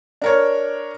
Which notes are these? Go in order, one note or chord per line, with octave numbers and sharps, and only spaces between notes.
D4 A#4 C#5